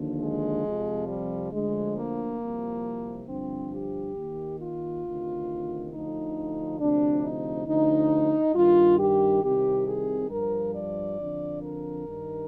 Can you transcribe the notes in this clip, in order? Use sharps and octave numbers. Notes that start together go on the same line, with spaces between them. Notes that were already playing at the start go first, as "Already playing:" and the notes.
Already playing: D#2 D3 F3
G#3
F2 C3 F3
G3
D2 D3 F3 G#3
A#3
C2 C3 F3
G2 D3 F3 C4
G4
D#2 D#3
F4
D2 C3 D#3
D2 D3 F3 D#4
D2 C3 F3 D4
D#4
D2 D3 F3 D#4
G2 D#3 F4
G4
C2 C3 D#3 G4
G#4
G2 F3 A#4
D5
F2 D3 F3
A#4
G2 D#3